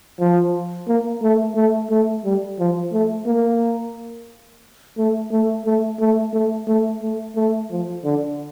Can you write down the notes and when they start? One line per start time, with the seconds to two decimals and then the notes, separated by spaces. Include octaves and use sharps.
0.20 F3
0.88 A#3
1.22 A3
1.56 A3
1.91 A3
2.25 G3
2.59 F3
2.93 A3
3.27 A#3
4.98 A3
5.31 A3
5.66 A3
6.00 A3
6.34 A3
6.68 A3
7.03 A3
7.36 A3
7.71 F3
8.04 D3